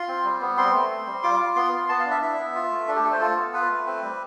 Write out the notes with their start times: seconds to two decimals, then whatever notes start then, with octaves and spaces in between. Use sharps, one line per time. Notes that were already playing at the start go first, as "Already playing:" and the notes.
Already playing: F4 C6
0.08 C4
0.24 G3
0.41 B3
0.57 C4 C6
0.74 A3
0.90 C4
1.07 G3
1.23 F4 D6
1.40 F4
1.56 B3 C6
1.73 B3
1.89 B3 A5
2.00 F5
2.05 D4
2.11 E5
2.22 E4 E5
2.38 B3
2.55 F4
2.71 A3
2.88 D4 A4
2.95 G4
3.04 A3 A4
3.12 C5
3.20 F4 A4
3.37 B3
3.53 F4 B4
3.70 A3
3.86 C4
4.03 G3